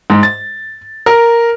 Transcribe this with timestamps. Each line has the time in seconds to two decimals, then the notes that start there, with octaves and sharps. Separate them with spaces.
0.10 G#2
0.23 A6
1.06 A#4